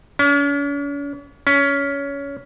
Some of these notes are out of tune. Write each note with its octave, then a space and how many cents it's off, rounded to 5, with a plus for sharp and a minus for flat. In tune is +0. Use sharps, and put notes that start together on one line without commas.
C#4 +45
C#4 +20